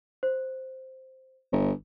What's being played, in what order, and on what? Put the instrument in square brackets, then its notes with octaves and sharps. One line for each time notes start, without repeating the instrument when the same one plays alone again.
[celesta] C5
[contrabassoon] G1